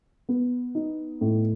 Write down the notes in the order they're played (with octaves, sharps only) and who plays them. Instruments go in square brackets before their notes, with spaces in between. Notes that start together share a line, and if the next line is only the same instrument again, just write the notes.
[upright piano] B3
D#4
A2